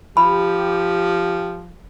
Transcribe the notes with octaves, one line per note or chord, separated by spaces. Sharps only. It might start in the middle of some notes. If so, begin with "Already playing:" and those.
F3 G4 B5